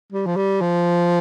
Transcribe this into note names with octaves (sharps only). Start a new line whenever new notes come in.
G3
F3
G3
F3